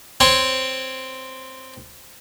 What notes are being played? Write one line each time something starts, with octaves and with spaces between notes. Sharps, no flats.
C4 C#5 C6